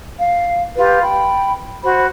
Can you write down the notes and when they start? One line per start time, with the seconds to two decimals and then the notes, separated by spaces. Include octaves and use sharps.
0.20 F5
0.77 F4 G4 B4
1.03 G5 B5
1.82 F#4 C5 B5